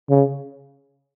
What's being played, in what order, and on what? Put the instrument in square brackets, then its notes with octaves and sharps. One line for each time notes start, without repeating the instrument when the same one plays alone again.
[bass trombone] C#3